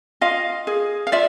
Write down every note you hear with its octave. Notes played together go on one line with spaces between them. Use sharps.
F4 D#5 F5
G#4
F5
F4 D5 E5